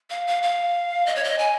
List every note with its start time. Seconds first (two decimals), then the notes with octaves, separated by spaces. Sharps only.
0.10 F5
0.27 F5
0.42 F5
1.06 D#5
1.15 C#5
1.24 D#5
1.38 G#5